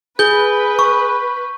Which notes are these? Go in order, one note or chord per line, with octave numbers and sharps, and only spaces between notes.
G#4 B4 G6 G7
C#6